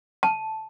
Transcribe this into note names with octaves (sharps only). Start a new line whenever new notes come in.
A5